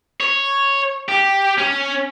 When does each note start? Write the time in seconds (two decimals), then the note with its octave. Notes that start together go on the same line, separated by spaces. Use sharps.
0.21 C#5
1.09 G4
1.58 C#4